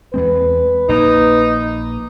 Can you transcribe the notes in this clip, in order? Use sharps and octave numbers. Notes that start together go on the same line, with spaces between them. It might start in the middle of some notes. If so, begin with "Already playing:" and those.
E2 G#3 C4 B4
A#1 A#3 D#4